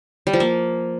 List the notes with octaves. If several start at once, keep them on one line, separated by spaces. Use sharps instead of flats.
G3
F3
A#3